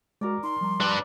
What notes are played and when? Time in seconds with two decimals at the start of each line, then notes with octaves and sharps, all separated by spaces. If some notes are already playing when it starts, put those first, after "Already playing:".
0.21 G#3 F#4 A#4 D5
0.43 D#4 A#5 C6
0.61 F3 G3 A#5
0.80 D4 B4 D5